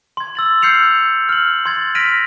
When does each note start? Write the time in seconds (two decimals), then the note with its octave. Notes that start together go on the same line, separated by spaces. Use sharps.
0.17 C6 G#6
0.35 E6 A6 F#7
0.62 E6 F6 G6 C7 C#7 F7
1.29 F6 F#7
1.66 C6 G#6 A6
1.95 F6 A#6 B6 D7 D#7 F7